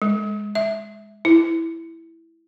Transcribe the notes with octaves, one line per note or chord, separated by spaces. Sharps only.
G#3
E5
E4